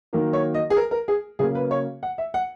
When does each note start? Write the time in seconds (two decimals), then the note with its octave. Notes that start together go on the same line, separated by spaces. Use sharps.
0.13 D#3 F#3 A#3
0.33 C#5
0.54 D#5
0.70 G#4
0.76 A#4
0.91 A#4
1.08 G#4
1.39 C#3 F#3 A#3 G#4
1.55 B4
1.71 C#5
2.03 F#5
2.18 E5
2.34 F#5